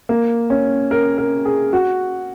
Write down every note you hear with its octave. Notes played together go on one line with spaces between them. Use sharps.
A#3
C#4
A#4
A#4
G#4
F#4